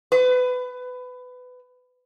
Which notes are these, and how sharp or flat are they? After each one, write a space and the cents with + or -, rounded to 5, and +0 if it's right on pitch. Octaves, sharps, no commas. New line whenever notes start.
B4 +20